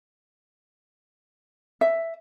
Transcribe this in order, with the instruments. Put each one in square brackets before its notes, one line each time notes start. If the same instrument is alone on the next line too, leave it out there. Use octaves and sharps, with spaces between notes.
[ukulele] E5